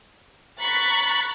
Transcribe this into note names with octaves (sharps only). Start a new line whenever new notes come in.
A#5 B5 C#6 F#6 A6 B6